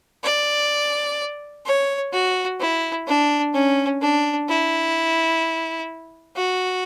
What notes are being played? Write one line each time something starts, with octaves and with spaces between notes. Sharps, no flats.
D5
C#5
F#4
E4
D4
C#4
D4
E4
F#4